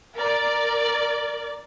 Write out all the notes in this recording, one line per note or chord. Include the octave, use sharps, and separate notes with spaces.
A#4 D5